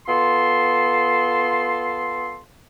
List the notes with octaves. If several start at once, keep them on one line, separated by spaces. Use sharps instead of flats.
B3 F4 A4 C6